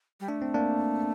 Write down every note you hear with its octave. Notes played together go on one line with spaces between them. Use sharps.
G3
A3 D4
C4
A#3 D4